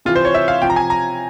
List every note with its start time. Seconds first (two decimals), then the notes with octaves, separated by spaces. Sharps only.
0.05 C3 E3 F4
0.16 C5
0.25 C#5
0.34 E5
0.48 F5
0.62 C3 F3 G5
0.70 A#5
0.76 G#5
0.90 A#5